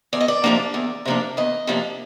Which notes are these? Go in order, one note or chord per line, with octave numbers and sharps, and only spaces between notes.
E2 D5
D#5
D5
C3 F3 A#3 D4
E2
C3 F3 A#3 D4
E2 D#5
C3 F3 A#3 D4